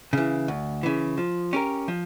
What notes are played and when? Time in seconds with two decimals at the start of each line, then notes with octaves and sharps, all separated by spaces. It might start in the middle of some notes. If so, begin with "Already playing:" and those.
0.13 C#3 E3
0.48 D2
0.83 C#3 E3
1.18 F3
1.53 C#4 G4 A#4
1.88 F3